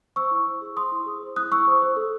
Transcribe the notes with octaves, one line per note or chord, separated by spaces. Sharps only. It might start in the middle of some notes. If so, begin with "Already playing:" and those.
C5 C#6 E6
E4
C5
G#4
C5 C6 D#6
E4
G#4
C5
E4 D#6 F#6
E4 C#6 E6
C5
C5
A4